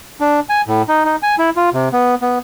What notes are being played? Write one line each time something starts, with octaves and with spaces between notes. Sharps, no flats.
D4
G#5
A2
D#4
D#4
G#5
E4
F4
C3
B3
B3